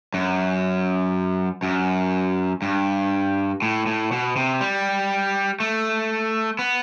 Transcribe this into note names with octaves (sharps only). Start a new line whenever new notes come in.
F#2
F#2
G2
A2
A2
B2
C3
G3
A3
B3